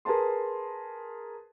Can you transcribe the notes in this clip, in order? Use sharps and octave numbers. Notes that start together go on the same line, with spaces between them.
G#4 A#4 B4 A5 C6